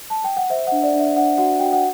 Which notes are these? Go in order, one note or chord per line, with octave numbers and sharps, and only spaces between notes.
A5
G5
F#5
C5 E5
D4 F#5
D5
D4
E5
D4 F#5
F#4 F#5
F#4 G5
F#5